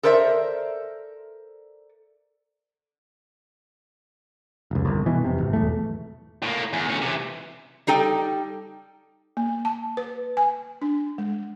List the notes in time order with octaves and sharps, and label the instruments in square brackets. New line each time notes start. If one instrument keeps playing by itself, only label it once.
[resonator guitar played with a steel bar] A4 A#4 C5 D5 E5
[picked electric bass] F1 C#2
G1 C2
B2 E3
F1 C3
G#1
B1 E2 A3
[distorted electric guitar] A2 A#3
E2
D2 C#4
C3 E3
[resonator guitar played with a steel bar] G3 D#4 A4 G5
[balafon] A#3
A5
B4
G#5
D4
G#3